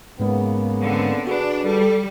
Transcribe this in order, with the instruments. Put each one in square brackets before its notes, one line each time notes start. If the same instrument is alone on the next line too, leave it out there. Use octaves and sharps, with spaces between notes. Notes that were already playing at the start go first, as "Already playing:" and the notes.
[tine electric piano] G#2 G#3 [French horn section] C#3 A#3 B3
[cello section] D3 C4
[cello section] D4 [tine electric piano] F#4 G#4 B4
[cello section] G3 [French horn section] A4